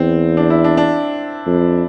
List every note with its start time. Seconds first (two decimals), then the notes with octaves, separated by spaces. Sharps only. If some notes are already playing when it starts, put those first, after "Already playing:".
Already playing: E2 C4
0.37 D4
0.50 E4
0.64 D4
0.77 D4
1.47 F2